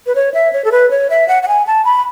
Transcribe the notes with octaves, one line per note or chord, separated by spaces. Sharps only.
B4
C#5
E5
C#5
A4
B4
C#5
E5
F#5
F#5
G#5
A5
B5